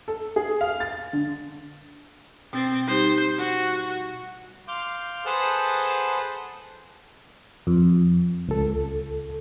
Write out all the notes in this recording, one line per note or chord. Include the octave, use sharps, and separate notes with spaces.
A4
G#4
F5
A6
D3
B2 C4 A6
G3 D#4 G4 C5
F#4
F5 C6 D6 G6
G#4 A4 B4 C5 F#5 A5
F2
C#2 A4